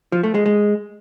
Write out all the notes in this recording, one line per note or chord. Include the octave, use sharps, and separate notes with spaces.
F3
A3
G#3
G#3